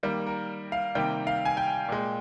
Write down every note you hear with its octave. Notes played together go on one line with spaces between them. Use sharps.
D#3 G3 A#3
A#4
F5
C3 D#3 G3 A#3 G5
F5
G#5
G5
A#2 G#3